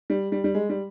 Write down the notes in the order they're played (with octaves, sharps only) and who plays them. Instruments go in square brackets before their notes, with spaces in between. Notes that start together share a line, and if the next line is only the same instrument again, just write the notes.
[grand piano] G3
G3
G3
G#3
G3